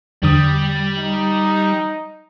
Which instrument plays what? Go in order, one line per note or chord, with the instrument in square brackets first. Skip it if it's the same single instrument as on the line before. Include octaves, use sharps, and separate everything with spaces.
[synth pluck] E2 D3 D#6 [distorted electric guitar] G3
[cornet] D#4